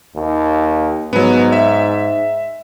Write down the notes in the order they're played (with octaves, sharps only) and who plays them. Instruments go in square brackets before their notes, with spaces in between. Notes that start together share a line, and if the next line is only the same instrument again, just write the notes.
[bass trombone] D#2
[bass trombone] G#2 [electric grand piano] F#3 B3
[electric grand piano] E5